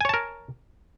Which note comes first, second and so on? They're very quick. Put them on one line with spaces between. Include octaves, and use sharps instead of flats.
G#5 C#5 A5 A#4